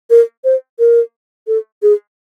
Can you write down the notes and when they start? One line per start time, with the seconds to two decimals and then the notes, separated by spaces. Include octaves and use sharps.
0.10 A#4
0.44 C5
0.79 A#4
1.47 A4
1.82 G#4